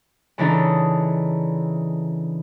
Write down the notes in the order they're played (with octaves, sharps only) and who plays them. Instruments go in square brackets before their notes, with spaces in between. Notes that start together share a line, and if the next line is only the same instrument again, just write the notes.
[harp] C#3 E3 D4 D#4 A4